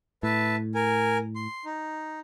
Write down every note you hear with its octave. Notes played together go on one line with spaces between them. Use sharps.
A2 B4 E5 A5
A#4 G#5
C6
D#4